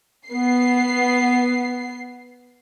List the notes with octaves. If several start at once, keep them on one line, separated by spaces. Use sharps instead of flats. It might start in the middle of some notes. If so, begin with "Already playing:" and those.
B3 C7